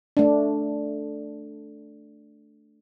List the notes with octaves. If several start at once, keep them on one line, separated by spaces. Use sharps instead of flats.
A3 D4